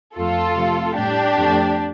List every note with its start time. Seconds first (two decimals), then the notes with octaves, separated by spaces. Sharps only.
0.16 F2 F3 A3 F4 A4
0.56 C3 F3 A3
0.96 A2 G3 D4 G4
1.36 F2 F3 A3